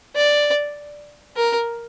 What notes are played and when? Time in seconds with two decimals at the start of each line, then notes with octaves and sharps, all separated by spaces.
0.16 D5
1.37 A#4